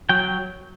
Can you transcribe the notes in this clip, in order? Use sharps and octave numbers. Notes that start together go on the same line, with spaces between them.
F#3 G5